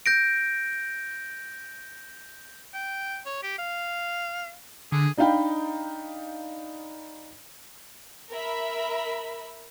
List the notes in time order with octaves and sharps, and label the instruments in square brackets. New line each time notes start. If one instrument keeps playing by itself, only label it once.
[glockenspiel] G6 A#6 D7
[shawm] G5
C#5
G4
F5
[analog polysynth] D3 [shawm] G#4
[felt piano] D4 D#4 D#5 F5 G5 B5
[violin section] A#4 E5 B5